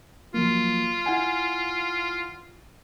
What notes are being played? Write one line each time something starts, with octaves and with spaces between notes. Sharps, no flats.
F3 F#3 A#3 F4
E4 F#5 G#5